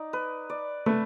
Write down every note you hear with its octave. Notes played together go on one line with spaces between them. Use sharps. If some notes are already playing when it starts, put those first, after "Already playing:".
Already playing: D#4 D5
B4
D5
A3 B4